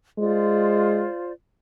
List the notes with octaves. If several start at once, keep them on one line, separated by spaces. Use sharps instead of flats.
G#3 F4 C5 D5